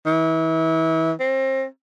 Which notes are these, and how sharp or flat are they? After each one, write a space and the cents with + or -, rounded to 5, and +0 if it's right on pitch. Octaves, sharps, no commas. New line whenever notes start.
E3 -30
C4 +30